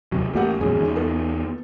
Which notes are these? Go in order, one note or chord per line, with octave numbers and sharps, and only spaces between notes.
D#2 C3 F#3
A1 A2 A#3 G4 F#5
E1 F2 A#2 C#4 G#4
E2 D#3
B3 A4